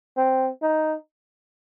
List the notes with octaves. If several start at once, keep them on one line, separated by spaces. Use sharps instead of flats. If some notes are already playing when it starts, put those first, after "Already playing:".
C4
D#4